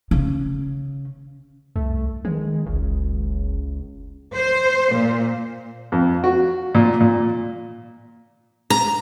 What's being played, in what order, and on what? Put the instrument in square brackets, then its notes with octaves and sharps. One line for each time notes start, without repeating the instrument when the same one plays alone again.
[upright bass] C#3
[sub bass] C2 [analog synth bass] A3
[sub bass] D#3 [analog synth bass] G#3
[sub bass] F#1 [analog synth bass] C#2
[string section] C5
A#2
[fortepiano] F2
F#4
A#2
A#2
[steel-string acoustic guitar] A#5